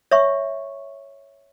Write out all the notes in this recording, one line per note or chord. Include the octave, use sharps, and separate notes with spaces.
C#5 E5 C#6